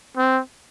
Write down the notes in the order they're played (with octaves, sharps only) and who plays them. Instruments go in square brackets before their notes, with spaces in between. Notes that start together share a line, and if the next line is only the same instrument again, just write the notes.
[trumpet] C4